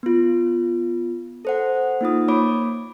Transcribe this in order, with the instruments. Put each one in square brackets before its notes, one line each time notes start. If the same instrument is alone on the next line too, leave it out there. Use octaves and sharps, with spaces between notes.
[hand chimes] B3 F4
A4 C5 F#5
A#3 D#4 F4 D#6
A#3 C#5 B5 D6 D7